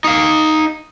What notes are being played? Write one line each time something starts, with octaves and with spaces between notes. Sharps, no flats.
D#4 F5